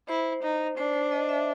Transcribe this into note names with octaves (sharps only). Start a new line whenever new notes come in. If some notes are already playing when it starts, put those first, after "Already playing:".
E4 C5
D#4
D4 C5
C5
D#5
E5